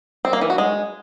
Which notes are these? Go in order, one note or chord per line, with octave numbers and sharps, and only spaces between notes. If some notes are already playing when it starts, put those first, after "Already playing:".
C4
A#3
E3
F#4
G#3